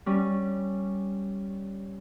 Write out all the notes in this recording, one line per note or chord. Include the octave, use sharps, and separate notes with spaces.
G3 C#4